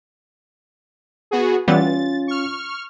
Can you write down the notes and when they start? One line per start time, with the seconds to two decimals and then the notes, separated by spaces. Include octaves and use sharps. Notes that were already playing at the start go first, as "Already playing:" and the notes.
1.31 B3 F#4 G#4
1.68 E3 G3 B3 C#4 F4 A6
2.27 C#6 F6